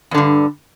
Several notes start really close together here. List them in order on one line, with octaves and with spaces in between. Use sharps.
E2 D3 G2